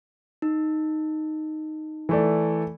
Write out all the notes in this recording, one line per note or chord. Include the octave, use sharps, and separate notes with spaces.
D#4
E3 A3 D5